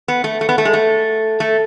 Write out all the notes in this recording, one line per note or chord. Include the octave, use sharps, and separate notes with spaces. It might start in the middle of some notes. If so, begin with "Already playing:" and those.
B3
A3
A3
B3
A3
G#3
A3
A3